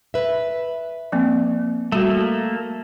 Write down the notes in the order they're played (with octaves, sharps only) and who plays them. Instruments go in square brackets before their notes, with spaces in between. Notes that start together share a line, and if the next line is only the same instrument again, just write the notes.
[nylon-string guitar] B4 E5
[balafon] F3 A#3 C4
[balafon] G3 F#4 [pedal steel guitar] A3 A#3